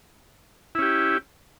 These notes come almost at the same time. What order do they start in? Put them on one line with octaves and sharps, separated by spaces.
E4 C#4 G4